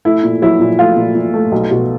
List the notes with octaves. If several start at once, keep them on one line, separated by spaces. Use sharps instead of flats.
A3 E4
A#2
F#3 E4
A#2
A3 F4
A#2
A#2
A3
B1
B2